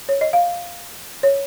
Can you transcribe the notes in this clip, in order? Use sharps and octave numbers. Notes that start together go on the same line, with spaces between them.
C#5
D#5
F5
C#5